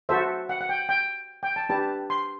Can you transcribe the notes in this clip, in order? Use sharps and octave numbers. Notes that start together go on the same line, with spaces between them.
F#4 A4 C5 E5
F#5
F#5
G5
G5
G5
A5
D4 G4 B4 A5
C6